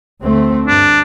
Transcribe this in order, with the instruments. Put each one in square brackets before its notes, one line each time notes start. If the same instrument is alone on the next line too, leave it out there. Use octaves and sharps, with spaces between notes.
[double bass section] D2 A3 C4
[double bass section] G2 [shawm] D4